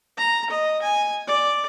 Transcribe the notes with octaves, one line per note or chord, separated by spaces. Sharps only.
A#5
D#5
G#5
D5